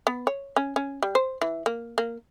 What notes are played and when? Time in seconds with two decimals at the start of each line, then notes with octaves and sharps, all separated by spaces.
0.07 B3
0.27 C#5
0.56 C#4
0.76 C#4
1.03 G3
1.15 C5
1.41 E3
1.66 A#3
1.98 A#3